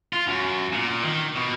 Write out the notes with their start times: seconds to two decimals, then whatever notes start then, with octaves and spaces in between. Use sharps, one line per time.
0.13 F4
0.27 F#2
0.73 A#2
1.03 D#3
1.36 B2